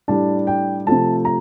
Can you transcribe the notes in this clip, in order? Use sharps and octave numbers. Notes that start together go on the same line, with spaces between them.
A2 G3 D4 A5
G5
C3 F3 A3 A5
A#5